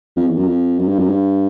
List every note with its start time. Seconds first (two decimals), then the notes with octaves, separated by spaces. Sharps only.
0.16 F2
0.27 E2
0.37 F#2
0.47 F2
0.79 F#2
0.88 G2
0.99 F#2
1.10 G2